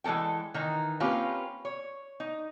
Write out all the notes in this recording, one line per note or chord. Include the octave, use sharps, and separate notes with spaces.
E3 G#3 C#4 A4 G5
D#3 E3 D#4
A#3 C4 C#4 F4 G4 B4
C#5
D#4